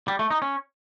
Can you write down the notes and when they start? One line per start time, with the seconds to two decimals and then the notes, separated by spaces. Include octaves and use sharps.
0.08 G3
0.19 A3
0.30 D#4
0.42 C#4